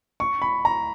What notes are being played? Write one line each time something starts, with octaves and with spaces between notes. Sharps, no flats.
C#6
B5
A#5